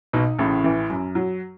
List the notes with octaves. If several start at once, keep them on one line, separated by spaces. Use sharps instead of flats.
B1 B2 D#4
A1 A2 C#3
E3
F#2
F#3